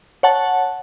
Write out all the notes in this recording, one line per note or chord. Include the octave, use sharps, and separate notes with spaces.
C#5 F#5 A5